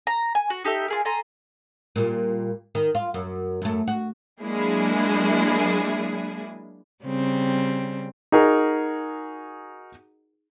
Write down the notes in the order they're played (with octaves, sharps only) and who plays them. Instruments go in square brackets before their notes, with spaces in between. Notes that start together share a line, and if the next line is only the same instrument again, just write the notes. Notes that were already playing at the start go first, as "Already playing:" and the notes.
[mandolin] A#5
G#5
F#4
D#4 G4 A4 E5
F4 G#4 A#4
A4 G#5 A#5 C6
[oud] A#2 G3
D#3
F4
F#2
F#2 A3
F#4
[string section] F#3 G#3 A#3 D4 E4 G#4
[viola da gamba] C#3 G3 C4
[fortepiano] D#4 F#4 G#4 A#4 D#5